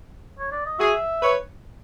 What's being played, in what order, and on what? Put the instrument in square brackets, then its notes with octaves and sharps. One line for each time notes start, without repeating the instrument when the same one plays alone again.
[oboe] C#5
D5
D#5
[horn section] F#4 G#4 [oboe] E5
[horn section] B4 C#5